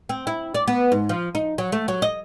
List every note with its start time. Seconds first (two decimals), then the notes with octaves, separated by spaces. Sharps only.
0.09 C4
0.27 E4
0.54 D5
0.68 B3
0.92 G#2
1.09 F3
1.35 D#4
1.58 F#3
1.72 A3
1.88 F#3
2.02 D#5